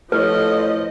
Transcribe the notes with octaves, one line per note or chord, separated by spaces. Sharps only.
A2 F3 A4 B4 C#5 D#5